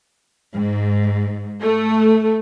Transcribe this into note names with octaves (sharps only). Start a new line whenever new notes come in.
G#2
A3